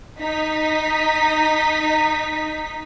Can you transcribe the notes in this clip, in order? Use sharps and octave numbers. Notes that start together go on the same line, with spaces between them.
D#4 B6